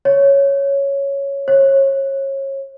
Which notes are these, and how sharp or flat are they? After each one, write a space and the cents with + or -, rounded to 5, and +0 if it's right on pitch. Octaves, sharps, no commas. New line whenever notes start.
C#5 +0
C#5 -30